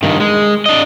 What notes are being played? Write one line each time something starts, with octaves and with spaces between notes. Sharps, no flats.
G2 D#3
G#3
D4 D#5